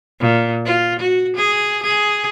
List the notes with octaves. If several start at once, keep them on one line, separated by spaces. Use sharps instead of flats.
A#2
F4
F#4
G#4
G#4